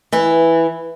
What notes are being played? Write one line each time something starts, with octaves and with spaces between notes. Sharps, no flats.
E3 E4